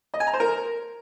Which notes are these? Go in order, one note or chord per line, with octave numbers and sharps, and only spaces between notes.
D#5
G#5
A#5
C5
A#4